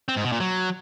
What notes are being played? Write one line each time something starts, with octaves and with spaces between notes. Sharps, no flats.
C4
G#2
B2
A#2
F#3